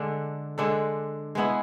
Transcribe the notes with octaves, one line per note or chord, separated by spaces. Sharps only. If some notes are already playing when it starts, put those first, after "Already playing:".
Already playing: D3 G#3 D4 A4
D3 G#3 D4 A4
G#3 B3 E4 G#4